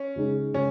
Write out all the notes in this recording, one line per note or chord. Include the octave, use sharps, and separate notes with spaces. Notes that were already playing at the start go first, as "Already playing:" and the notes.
Already playing: C#4
C#3 G#3 D#4 G#4
C#3 G#3 C#4